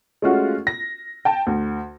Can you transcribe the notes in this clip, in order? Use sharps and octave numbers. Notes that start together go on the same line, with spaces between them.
G#3 A3 C#4 F4 F#4
A#6
G5 A5
D2